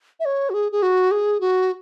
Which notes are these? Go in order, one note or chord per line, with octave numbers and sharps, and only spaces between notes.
E5
C#5
F#4
G#4
G#4
F#4
G#4
F#4